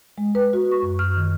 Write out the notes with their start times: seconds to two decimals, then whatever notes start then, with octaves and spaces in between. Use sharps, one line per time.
0.18 G#3
0.35 B4
0.53 F#4
0.71 C#6
0.83 F#2
0.99 F6
1.17 D#3